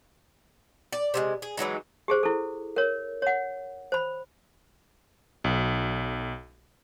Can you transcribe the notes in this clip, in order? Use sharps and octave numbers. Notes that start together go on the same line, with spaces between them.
D5
C3 F#3 G#3
G#4
E3 F#3 G#3 D#4
G4 G#4 C5
E4 A4
A#4 C#5
C#5 F#5
C5 B5
B1